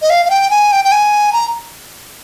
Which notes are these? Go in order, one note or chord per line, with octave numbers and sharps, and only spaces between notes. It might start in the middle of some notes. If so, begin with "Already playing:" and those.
D#5
F5
F5
G5
G#5
G5
G5
G#5
A#5